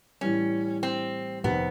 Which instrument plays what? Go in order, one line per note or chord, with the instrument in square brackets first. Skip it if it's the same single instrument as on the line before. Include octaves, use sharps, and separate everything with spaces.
[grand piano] A2 E3 G3 [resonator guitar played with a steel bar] C#4
[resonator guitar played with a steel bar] C4
[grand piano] F1 F2 C3 D#3 [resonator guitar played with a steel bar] B3